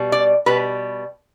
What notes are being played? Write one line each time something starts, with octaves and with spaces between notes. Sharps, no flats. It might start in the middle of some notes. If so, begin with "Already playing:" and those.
Already playing: B2 G3
D5
B2 G3 B4